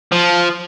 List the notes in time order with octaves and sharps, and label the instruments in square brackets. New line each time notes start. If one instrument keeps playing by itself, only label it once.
[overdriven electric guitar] F3